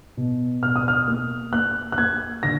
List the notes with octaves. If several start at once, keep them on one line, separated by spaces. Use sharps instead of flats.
B2
B2 F6
D#6
F6
A#3
A#3 F#6
F#6
A#3 G#6
D3 A#6